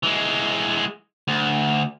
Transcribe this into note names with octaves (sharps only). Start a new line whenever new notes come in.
E3 G#3
D2